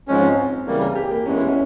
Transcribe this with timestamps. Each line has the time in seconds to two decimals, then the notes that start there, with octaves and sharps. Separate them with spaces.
0.08 G#2 F3 G#3 C4 C#4
0.22 C4
0.67 C#3 E3 G3 A#3 A#4
0.81 G#4
0.95 G4
1.11 A#3
1.26 E2 E3 G#3 C#4
1.37 E4
1.49 C#4